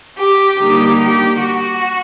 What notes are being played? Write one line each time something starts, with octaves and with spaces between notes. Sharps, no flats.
G4
D3 G3 A#3 D#4 G4
G4
F#4